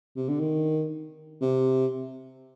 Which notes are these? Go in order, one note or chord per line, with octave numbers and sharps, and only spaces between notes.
C3
D3
D#3
C3